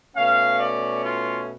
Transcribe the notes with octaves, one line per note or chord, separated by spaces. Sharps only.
B2 A3 C#4 F5
D5
F4